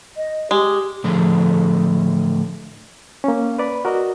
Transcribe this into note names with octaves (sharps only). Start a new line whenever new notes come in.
D#5
G#3 G4
A2 D3 F3 G#4 A4
A#3 C#4
B4 D5 B5
F#4 A#4 D5 D#5